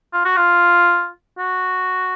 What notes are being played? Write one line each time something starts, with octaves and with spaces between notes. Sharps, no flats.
F4
F#4
F4
F#4